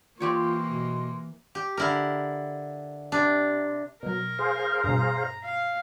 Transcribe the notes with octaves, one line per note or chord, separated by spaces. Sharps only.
E3 A#3 C4 F4 G4 C#5 C6
B2
G4
D3 E4 A#4
C3 D4
B2 F#3 A#4
G#4 C5 F5
G2 B2 A#5
F5